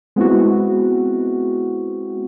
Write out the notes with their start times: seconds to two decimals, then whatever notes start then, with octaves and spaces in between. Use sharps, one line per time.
0.16 G#3 B3 C4 E4 F#4